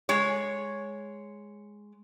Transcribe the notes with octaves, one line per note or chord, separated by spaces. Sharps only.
G#3 C#5